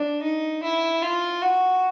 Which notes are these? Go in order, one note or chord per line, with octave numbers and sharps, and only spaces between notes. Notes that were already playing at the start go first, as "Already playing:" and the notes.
Already playing: D4
D#4
E4
F4
F#4